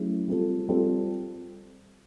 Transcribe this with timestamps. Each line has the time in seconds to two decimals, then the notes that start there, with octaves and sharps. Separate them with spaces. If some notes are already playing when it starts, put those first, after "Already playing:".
Already playing: F#3 A3 C#4 E4 G#4
0.28 G3 C4 F4 A4
0.69 G3 C4 F4 A4